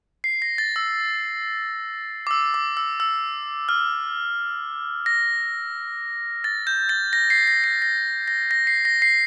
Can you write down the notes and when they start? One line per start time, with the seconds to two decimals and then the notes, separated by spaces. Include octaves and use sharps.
0.24 C7
0.42 A#6
0.58 A6
0.76 E6
2.27 D6
2.31 E6
2.54 D6
2.77 E6
3.00 E6
3.69 F6
5.06 A#6
6.44 A6
6.67 G6
6.89 A6
7.13 A#6
7.30 C7
7.48 A#6
7.64 C7
7.82 A#6
8.28 A#6
8.51 A#6
8.67 C7
8.85 A#6
9.02 C7